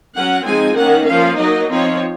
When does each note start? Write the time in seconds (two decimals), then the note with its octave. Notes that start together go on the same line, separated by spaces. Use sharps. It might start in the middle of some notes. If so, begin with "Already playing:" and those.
0.13 F#3 C#4 F#5
0.44 F3 G#3 C4 D#4 G#5
0.75 D#3 A#3 C#4 F#5
1.06 F3 A#3 C#4 F5
1.37 F#3 A#3 D#4 D#5
1.68 F3 C4 D#4 C#5